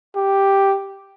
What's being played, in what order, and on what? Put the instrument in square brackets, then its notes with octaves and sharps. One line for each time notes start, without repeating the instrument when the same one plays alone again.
[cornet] G4